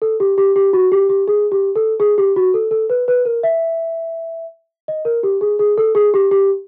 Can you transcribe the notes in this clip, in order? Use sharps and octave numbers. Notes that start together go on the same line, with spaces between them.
A4
G4
G4
G4
F#4
G4
G4
G#4
G4
A4
G#4
G4
F#4
A4
A4
B4
B4
A#4
E5
D#5
A#4
G4
G#4
G#4
A4
G#4
G4
G4